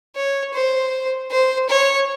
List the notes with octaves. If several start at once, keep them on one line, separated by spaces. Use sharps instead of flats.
C#5
C5
C5
C#5